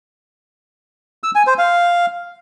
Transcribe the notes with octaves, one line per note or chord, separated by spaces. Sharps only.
E6
G#5
C5
F5